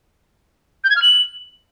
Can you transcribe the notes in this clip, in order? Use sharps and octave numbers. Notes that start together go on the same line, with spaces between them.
G6
G#6
F6
F#7